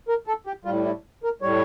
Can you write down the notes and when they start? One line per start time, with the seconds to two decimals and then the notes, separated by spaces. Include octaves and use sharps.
0.08 A#4
0.27 A4
0.47 G4
0.65 A2 G3 F4
0.85 E4
1.23 A#4
1.42 A2 G3 C#5